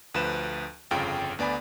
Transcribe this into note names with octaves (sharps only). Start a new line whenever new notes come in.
D2 F3 B4 E7
G1 F2 C#3 F4 G5 D7
D2 B3 D5 G#5 B5